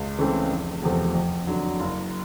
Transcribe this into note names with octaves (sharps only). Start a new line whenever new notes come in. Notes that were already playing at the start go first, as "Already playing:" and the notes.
Already playing: C#2
C#3 E3 A3 C4
F1
E2 C3 F3 A3
F2
D3 F#3
F#1